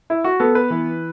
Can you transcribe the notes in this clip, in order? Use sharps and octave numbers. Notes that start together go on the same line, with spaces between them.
E4
F#4
B3 A4
B4
E3